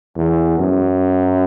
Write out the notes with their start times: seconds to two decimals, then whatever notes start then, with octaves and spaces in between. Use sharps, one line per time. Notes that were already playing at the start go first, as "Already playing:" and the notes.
0.16 E2
0.59 F#2